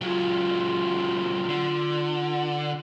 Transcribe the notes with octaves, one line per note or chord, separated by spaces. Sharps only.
C#2 F#3 F4
D3